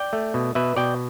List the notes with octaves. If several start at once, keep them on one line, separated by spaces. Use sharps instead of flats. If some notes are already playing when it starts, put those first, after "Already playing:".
Already playing: D5 G5
A3
B2
B2 B4 E5
B2 D5 G5